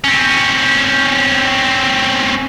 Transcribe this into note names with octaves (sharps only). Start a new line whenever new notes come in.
C4 C#4